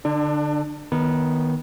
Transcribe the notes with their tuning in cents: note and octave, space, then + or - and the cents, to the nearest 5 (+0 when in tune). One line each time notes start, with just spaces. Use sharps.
D3 +0 D4 +35
D#3 +0 B3 -15